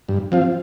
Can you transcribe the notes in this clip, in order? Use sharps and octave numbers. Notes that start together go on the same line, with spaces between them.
G2
F3 C4 F4